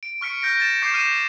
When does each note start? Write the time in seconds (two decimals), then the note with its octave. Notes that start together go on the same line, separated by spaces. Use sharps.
0.03 D7
0.21 C#6 F6 B6 C#7 D7
0.42 F6 G6 A#6 D7
0.60 A6 E7
0.82 C#6 D6 G6 C7 E7
0.94 F6 G6 A#6 C7 D#7 E7